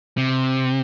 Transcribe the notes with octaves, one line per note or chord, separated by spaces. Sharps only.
C3